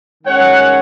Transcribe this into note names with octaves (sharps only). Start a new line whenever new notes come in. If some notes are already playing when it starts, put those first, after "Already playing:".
D#3 G#3 C#4 C#5 F#5